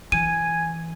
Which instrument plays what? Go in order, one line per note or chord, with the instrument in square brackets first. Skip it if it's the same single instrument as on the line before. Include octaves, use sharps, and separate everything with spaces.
[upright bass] E3 [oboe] G#5 [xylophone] D#7